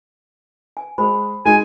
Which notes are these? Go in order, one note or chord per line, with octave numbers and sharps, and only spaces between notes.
G#5
G#3 C5 G#5 B5
G#3 D#4 G#5